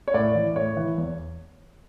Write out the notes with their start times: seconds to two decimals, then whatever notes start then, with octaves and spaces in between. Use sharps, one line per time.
0.08 C#5
0.14 A2 D5
0.35 E3
0.56 A2 C#5
0.77 E3
0.98 E2